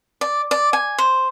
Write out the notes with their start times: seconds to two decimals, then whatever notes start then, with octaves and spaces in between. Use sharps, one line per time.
0.21 D5
0.51 D5
0.73 G#5
0.98 C5